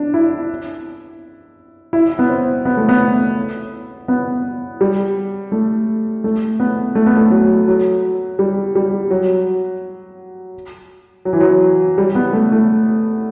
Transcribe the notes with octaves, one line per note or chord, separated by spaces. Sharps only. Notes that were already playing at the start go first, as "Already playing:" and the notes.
Already playing: D4
E4
E4
B3
C4
B3
A3
B3
B3
G3
A3
A3
B3
A3
B3
A3
F#3
F#3
G3
G3
F#3
F#3
E3
F#3
G3
B3
A3
A3